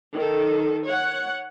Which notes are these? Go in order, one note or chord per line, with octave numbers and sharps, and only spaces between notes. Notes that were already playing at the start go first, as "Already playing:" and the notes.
D#3 A4
C#5 F#5